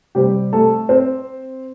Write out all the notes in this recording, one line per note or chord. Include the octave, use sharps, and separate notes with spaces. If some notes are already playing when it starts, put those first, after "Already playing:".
C3 G3 C4 G4
A3 A4
C4 C5